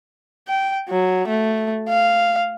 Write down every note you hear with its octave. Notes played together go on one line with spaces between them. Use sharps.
G5
F#3
A3
F5